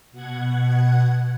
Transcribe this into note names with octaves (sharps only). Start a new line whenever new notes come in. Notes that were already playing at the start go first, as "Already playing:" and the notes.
B2 F#5 G#6